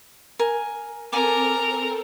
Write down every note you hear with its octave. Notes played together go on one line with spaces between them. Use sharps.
A#4 G#5
C4 A4 A#4 G#5 A5 D6